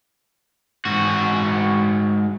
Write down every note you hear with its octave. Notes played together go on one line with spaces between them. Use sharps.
G#2 F#4